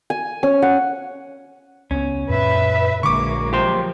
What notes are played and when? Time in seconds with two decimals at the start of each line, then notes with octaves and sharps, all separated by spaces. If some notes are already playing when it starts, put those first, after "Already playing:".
0.10 G#5
0.43 C#4
0.62 F#5
1.91 C#2 B3 C#4
2.30 F#2 A#2 B4 E5
3.03 A#1 D3 F#3 G#3 A#3 C#6 D6
3.53 F3 G4 C5